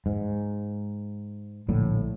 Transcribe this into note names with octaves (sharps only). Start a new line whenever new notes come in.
G#2
A#1 A2 D3